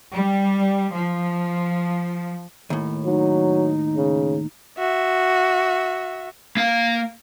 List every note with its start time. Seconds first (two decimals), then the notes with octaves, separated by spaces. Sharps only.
0.13 G3
0.93 F3
2.70 D#2 A2
3.05 F#3 D#4
3.97 C#3
4.78 F#4 E5
6.57 A#3 F5